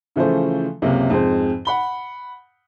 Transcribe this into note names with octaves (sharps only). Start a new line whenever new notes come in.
C#3 E3 F3 A3 C5
C#2 F#2 C3 A#3
F2 G#2 G#3 C5
F#5 B5 G7